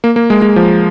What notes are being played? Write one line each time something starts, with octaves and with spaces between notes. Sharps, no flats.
A#3
A#3
G#3
G#3
F3